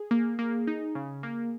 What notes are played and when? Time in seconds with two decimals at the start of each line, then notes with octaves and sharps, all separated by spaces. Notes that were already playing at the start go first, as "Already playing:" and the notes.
Already playing: G#4
0.11 A#3
0.39 A#3
0.67 D#4
0.95 C#3
1.23 A#3